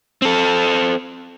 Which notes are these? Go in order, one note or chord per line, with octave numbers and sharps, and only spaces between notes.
C4 A4